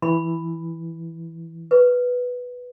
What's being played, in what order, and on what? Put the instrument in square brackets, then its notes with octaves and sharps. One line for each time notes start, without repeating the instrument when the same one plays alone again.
[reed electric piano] E3 [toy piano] B5
[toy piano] B4